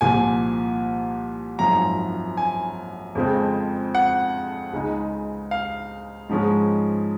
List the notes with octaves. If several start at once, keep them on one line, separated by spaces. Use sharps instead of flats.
C2 A#2 F3 G#5
G#1 F#2 F3 A#5
G#5
F2 C#3 F3 G#3 C4
F#5
C#2 C#3 G#3 D#4
F5
G#2 F3 G#3 C#4